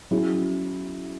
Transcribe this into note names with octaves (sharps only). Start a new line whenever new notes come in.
F#3 C#4 E4 G#4